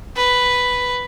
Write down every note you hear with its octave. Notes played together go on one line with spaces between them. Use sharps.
B4